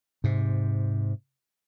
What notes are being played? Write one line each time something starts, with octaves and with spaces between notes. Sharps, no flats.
G#2 C3